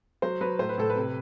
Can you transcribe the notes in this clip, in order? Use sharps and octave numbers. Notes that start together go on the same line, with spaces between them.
F#3 C5
F#3 B4
A2 C5
B4
A2 A4
B4
C3